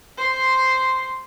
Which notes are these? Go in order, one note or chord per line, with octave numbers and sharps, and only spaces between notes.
C5 C6